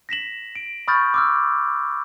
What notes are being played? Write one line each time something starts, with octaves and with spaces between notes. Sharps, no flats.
A#6 B6 E7 F#7
D7
B5 C#6 D#6 F6 G6 A6
D6 E6 F6